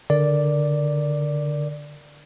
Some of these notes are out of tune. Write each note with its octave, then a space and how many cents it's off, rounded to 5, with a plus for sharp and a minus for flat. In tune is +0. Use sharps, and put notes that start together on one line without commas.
D3 +5 A#4 +0 D5 +0